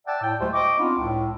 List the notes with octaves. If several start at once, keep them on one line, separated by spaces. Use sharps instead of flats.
D5 E5 F#5 G5 A5
A2 G5
D2 F#3 G#3 A3 G4 C5
D#5 G5 C#6 D6
B3 C4 D4 D#4 F4
C#2 A2